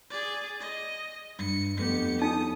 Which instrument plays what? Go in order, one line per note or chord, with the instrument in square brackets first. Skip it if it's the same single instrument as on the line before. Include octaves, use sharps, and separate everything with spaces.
[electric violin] G#4 D5
D#5
[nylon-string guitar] G2 [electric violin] C#7
[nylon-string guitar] F2 A3 B3 [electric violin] G4 C#7
[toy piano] D#4 [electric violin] D#6